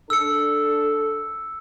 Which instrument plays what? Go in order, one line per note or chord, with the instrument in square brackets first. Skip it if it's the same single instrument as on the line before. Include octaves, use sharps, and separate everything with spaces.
[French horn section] D4 A4 [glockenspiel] E6 C#7